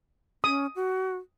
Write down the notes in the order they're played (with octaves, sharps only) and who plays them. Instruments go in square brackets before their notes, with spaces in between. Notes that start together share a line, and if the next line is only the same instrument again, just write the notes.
[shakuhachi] C#4 [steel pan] D#6
[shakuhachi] F#4